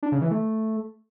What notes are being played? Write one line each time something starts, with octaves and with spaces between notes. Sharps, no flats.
D4
C#3
E3
A3